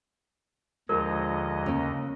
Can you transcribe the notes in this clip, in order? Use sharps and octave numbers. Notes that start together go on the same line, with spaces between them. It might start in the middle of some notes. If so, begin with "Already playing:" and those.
D#2 D3 F3 G#3 A#4 D#5
C#3 A#3